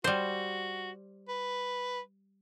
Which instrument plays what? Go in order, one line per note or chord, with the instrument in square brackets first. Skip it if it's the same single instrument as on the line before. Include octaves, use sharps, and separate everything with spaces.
[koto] G3 C5 [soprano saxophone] F#4
[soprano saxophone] B4